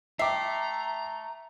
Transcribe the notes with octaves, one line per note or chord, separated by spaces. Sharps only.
A3 E5 G5 A#5 D6 C7